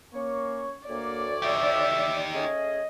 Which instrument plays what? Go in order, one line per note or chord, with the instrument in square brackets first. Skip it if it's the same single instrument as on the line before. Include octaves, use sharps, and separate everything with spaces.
[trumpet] A#3 [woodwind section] C#4 C#5 C#6
[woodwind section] D2 C#5 [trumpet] A#3 [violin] D5
[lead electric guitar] D#4 G4 [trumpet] E5
[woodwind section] A3 C#4 G#4 [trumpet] D#5